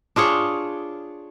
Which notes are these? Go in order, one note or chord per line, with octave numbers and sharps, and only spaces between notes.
D4 F4 G#4 C#5